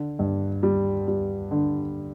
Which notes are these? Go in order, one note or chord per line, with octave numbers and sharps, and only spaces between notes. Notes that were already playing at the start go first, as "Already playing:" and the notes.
Already playing: D3
G2
G3
G3
D3